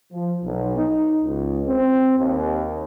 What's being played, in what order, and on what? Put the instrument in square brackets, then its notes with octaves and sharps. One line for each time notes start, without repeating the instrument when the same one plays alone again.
[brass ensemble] F3
B1
D#4
C#2
C4
D#2